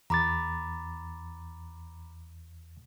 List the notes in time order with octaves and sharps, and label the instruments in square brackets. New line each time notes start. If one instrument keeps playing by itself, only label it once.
[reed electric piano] E2 A6 [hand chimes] A#5 B5 D6